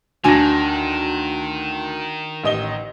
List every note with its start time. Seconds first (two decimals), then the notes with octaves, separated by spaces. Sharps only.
0.24 D2 D#3 D4 F#4 G#5 A#6
2.44 A1 D#5 G7